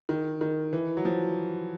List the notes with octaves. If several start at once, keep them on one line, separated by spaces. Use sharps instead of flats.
D#3
D#3
E3
F#3
F3